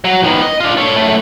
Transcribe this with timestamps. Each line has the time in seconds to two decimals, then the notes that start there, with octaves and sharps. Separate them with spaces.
0.05 F#3
0.24 D#3 B3
0.42 D#5
0.60 D4 F4
0.77 A4 C#5
0.96 F#2 A3